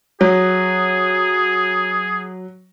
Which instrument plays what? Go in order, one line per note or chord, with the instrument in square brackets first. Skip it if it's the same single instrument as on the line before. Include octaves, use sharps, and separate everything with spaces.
[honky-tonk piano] F#3 [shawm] G#4